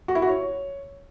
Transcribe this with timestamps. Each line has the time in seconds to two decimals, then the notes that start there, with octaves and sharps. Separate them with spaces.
0.08 F#4
0.15 E4
0.22 F#4
0.29 C#5